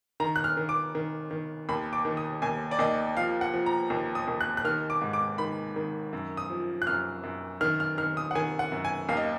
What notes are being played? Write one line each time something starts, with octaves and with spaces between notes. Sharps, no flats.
D#3 A#5
F#6
F6
D#3
D6
D#3
D#3
D#2 B5
D6
D#3
D#6
D#2 G#5
D5
D#2 D#5
F3 F5
F#5
F3
A#5
D#2
D#6
D#2
F#6
F#6
D#3 F6
D6
G#2
D6
D#3 B5
D#3
F#2
D#6
F3
F#6
F#2 F6
F#2
D#3 F6
F6
D#3 F6
D#6
F#5
D#3 G#5
F#5
F#2
G#5
D#2 F5
D#5